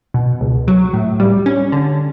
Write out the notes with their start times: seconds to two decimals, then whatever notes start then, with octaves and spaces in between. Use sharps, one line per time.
0.14 B2
0.41 C#2
0.68 F#3
0.94 A2
1.20 G3
1.46 C#4
1.72 D3